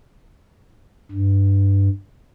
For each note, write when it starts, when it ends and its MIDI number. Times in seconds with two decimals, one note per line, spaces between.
1.11 1.89 43